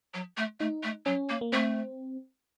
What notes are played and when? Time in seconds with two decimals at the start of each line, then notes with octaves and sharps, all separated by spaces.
0.14 F#3
0.37 A3
0.60 A3 D#4
0.83 A3
1.06 F#3 C#4
1.29 A#3
1.41 A#3
1.53 A3 C4